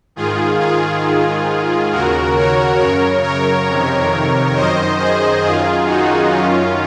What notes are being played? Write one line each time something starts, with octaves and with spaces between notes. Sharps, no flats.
G#2 D#3 F4 G#4
F4 G#4
G#2 D#3
D#2 C#3 F#4 A#4
A#4 C#5
F#2 C#3 A#4 C#5
A#4 C#5
F2 C3 D#3
F#2 D#3 C5 D#5
G#4 C5
F#2 D#3 F4 G#4
D#4 F#4
F#2 D#3 C#4 F4